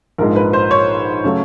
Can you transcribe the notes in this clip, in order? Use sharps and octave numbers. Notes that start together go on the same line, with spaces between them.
A#1 G#2 F3 G#3 A#4
B4
C5
C#5
C#3 F#3 A3